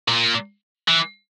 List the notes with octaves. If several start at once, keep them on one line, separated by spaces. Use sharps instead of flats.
A#2
E3